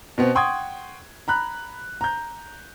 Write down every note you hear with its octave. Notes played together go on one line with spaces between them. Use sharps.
B2 B3 C4
F#5 G5 C6 C#6 D#6 G#6
A#5 B5 F#6
A#5 G6